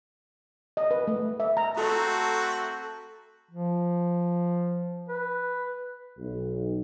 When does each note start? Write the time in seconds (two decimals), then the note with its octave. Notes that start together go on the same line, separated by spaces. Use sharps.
0.77 D#5
0.91 B4
1.07 A3
1.40 E5
1.57 A#5
1.77 A3 C4 F#4 A4 A#5
3.51 F3
5.09 B4
6.18 B1